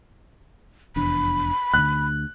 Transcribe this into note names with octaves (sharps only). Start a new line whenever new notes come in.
F1 E2 D4 B5
D2 D3 F#6